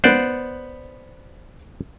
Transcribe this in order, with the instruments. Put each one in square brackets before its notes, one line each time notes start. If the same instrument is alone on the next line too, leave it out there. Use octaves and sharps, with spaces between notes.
[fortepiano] B3 F#5 F#6 [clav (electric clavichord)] C5 D5